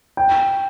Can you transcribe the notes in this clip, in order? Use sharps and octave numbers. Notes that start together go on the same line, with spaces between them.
G5